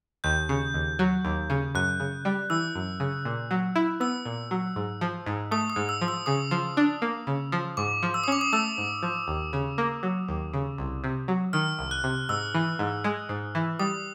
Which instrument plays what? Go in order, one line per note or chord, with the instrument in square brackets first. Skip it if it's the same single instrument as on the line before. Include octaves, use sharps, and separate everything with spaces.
[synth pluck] D#2 [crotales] G6
[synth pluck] C#3
D#2
F#3
D#2
C#3
[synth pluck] F#2 [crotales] F#6
[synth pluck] C#3
G3
[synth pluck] E3 [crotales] E6
[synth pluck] F#2
C#3
A#2
F#3
E4
[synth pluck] B3 [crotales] E6
[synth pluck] A#2
F#3
G#2
F3
G#2
[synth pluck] A3 [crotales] D#6
[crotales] D#6
[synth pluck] G#2
[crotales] E6
[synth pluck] F3
[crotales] E6
[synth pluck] C#3 [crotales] D#6
[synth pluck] F3
D4
A#3
C#3
F3
[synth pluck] G#2 [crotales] D6
[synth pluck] F3
[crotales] E6
D#6
[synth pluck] C#4 [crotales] D6
[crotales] D#6
[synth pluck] A3 [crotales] E6
[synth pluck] G#2
F3
D#2
C#3
A#3
F#3
D#2
C#3
C2
C3
F#3
[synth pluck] D#3 [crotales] F6
[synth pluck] C2
[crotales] F#6
[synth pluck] C3
[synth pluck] G#2 [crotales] E6
[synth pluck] E3
G#2
G#3
G#2
E3
[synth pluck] G3 [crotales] D#6